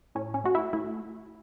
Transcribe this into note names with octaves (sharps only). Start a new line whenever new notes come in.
A2 C#4
C#4
A3 F#4
E4
A3 E4